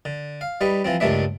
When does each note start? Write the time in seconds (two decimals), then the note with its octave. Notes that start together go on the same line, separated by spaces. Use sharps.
0.05 D3
0.41 F5
0.61 G3 D#4 B4
0.84 E3 F3 C4
1.00 C#2 G2 D#3 A3 D4 E5